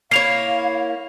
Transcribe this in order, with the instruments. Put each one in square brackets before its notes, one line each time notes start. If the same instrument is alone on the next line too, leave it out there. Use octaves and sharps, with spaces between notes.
[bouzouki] A#3 E4 C#5 [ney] F5 [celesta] C7 F7